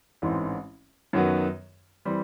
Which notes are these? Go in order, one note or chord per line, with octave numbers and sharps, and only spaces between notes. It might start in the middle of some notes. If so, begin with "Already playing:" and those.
A1 G#2 E3 G#3 C4
F#2 D#3 F#3 B3
E3 G3 C4